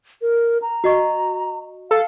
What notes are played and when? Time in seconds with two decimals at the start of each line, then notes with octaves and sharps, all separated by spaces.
0.22 A#4
0.62 A#5
0.84 F#4 D#5 C#6
1.91 A4 F5